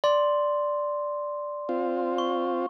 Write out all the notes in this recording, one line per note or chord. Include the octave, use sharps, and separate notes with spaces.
D5 C6
C4 F4
C#6